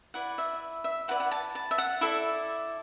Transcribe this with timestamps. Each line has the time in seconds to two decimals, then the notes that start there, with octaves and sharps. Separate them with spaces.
0.14 E4 B4 D5 F#5
0.38 E5
0.84 E5
1.08 E4 B4 D5 F#5
1.20 F#5
1.31 A5
1.55 A5
1.71 E5
1.78 F#5
2.01 E4 A4 D5 E5